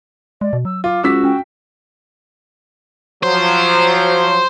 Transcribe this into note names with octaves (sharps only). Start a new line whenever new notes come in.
G#3 D5
B2
F#3 E6
F4 D6
C#2 F#4 E6 B6
C#4 G5
F3 F#3 C5